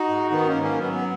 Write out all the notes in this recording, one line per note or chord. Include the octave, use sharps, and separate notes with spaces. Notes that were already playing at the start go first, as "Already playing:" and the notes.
Already playing: D#4 F#4
G#2
D#3 B3 D#4
A#3 C#4
G#2
A#3 C#4
F#3 B3
B3